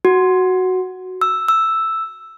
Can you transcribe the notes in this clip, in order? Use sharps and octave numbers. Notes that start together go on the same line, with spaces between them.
F#4
E6
E6